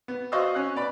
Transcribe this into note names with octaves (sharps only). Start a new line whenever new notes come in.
B3
F#4 C5 D#5 F5 C#6 E6
C#4 F#6
B3 D5 B5